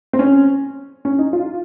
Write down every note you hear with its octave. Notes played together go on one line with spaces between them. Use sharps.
C4
C#4
C#4
D#4
F4